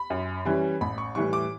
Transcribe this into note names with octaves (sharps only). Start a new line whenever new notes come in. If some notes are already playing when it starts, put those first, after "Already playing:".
Already playing: B5
F#2
E3 G3 C#4
A1 B5
C#6
A2 E3 G3 C#6
D6